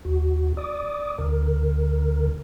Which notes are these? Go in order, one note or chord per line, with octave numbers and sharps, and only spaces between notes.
D#2 F#4
D5 D6 D#6
D2 D3 A#4